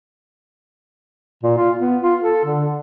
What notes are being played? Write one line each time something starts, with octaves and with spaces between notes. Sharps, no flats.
A#2
F4
B3
F4
A4
D3